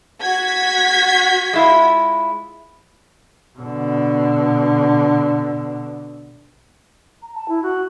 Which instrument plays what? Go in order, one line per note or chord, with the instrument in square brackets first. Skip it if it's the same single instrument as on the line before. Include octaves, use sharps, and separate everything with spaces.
[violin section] F#4 G#6 B6
[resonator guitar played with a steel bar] G#3 E4 F4
[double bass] B2 D3
[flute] A#5
A5
E4
F#4